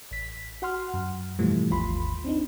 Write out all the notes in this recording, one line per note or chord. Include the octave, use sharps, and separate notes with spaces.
A1 B6
F#4 F#5 C6 F6
F#2
G#2 B2 E3 F3 G3 A3
G#1 D#2 F4 B5 C6
C4 D4 D#4